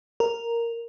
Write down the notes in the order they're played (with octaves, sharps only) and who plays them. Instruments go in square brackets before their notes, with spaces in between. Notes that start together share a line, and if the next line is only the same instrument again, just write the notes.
[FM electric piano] A#4